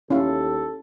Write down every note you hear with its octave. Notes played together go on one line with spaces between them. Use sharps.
D#2 C#4 E4 G4 A4 F5